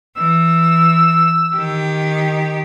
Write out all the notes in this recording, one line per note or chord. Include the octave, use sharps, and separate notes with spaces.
E3 E6
D#3 G4